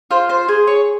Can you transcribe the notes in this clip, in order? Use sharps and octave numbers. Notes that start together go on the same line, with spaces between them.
F4 C5
C5
G#4 C5
C#5